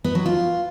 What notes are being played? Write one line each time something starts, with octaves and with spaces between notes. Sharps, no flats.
B3
F#3
F4